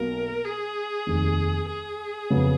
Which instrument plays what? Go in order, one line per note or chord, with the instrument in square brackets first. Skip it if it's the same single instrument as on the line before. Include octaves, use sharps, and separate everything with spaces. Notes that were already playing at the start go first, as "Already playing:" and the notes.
Already playing: [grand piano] B1 B2 A#3 [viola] A#4
[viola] G#4
[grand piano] F1 D#2 D#3
[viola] G#4
[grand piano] F2 C#3 F#3 B3